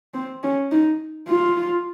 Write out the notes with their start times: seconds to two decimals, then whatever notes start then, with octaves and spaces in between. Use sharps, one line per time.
0.14 C4
0.43 C#4
0.71 D#4
1.29 F4